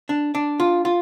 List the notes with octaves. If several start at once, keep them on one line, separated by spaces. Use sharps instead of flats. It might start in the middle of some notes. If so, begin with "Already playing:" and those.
D4
D4
F4
F4